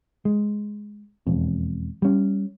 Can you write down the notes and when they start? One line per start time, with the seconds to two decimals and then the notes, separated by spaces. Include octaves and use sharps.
0.25 G#3
1.27 E1 F2
2.02 G3 C#4